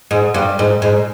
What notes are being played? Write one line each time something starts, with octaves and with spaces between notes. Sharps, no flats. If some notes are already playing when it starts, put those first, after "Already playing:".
G#2
G2
G#2
G#2